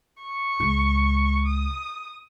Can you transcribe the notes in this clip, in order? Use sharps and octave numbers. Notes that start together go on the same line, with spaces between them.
C#6
C#2 G#3
D#6